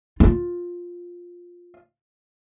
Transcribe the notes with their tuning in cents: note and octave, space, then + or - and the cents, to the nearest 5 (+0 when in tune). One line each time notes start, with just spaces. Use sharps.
F4 +10